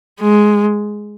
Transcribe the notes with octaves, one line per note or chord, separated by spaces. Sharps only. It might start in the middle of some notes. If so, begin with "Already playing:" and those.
G#3